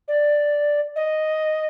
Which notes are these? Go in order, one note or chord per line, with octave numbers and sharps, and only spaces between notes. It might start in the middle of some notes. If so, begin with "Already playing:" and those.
D5
D#5